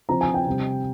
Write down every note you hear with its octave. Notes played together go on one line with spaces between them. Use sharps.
F3 C4 A#5
G#5
G5
C3 G3 C4